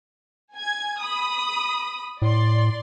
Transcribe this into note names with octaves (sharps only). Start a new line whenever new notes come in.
G#5 G#6
B5 D#6
A2 D5 C6